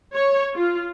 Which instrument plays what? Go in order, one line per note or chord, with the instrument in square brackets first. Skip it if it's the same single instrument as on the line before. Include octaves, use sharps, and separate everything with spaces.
[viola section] C#5
F4